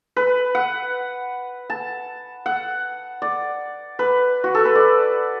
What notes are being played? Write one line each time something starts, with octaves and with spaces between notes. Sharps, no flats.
B4
F#5
A5
F#5
D5
B4
F#4
A4
B4
D5